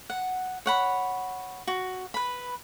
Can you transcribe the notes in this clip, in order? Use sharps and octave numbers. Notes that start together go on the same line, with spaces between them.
F#5
C#5 F#5 B5
F#4
B4 B5